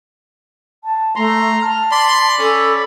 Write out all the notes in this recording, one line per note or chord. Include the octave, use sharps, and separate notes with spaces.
A5
A3 A#5 C6
A5 F6
D5 B5 C6
C#4 A4